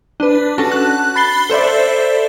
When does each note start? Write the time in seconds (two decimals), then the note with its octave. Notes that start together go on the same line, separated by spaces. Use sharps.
0.20 D4 B4
0.58 C#4 F#4 A4 A5
0.72 F#6
1.16 B5 A6 C7 G7
1.50 A4 C5 D5 E5